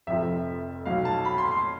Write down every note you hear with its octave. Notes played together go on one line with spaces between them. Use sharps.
F1 F2 C3 F3 E5
B1 B2 F5
A5
B5
C6
C6